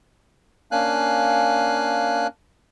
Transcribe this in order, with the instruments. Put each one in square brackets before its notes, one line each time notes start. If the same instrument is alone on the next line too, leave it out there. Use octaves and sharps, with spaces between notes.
[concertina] A#3 C#4 D4 F5 G#5 F#6